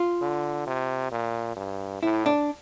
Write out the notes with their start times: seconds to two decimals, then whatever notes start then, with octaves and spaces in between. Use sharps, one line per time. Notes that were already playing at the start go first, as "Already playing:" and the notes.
Already playing: F4
0.21 D3
0.67 C3
1.12 A#2
1.57 G2
2.02 A2 E4
2.26 D4